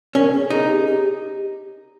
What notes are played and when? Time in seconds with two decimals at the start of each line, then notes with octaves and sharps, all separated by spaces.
0.15 C#4 A#4
0.33 G#4
0.50 D#4 G#4
0.69 G4
0.86 G4